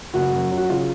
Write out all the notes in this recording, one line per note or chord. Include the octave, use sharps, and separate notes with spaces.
F#1 F#4
F#2
F#3
F#4
C#3 F4